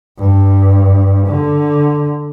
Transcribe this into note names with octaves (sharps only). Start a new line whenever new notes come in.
G2
D3